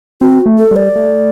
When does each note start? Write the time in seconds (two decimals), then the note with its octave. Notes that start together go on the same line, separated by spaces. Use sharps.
0.21 C4 F#4
0.46 A3
0.58 A4
0.71 G3
0.76 D5
0.96 A3